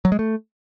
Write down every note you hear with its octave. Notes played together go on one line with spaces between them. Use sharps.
F#3
G#3
A3